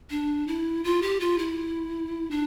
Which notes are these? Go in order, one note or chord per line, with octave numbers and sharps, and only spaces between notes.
D4
E4
F4
G4
F4
E4
D4